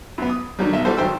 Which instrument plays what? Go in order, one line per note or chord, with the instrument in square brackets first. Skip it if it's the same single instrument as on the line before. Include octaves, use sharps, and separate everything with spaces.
[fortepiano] F#2 B3
D#6
D3 D#3 F#3 G3
B1 E5
E3 G3 F#4 A4 C5
G#1 F#3 C5 G5 E6